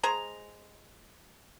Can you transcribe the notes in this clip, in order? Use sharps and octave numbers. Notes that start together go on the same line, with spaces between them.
G#3 G#4 C5 A#5